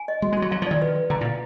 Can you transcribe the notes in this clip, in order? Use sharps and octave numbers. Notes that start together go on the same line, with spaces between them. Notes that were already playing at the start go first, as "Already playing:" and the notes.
Already playing: G#5
D#5
G#3 F#4
G#3
F#3 F#4
F#3 F5
F3
D#3 D5
B4
B4
D3 A#5
A#2
F5